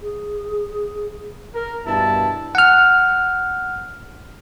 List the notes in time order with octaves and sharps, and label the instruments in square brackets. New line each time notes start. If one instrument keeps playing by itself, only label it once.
[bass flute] G#4
[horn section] A#4
G2 B2 E4 A5
[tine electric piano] F#5 F6